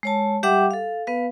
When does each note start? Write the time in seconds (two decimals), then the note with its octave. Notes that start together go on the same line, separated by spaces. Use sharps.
0.03 G#3 C#5 A5
0.43 G3 G4 E5 F#5 G5 D6
0.71 A4 F5
1.07 B3 B4 F5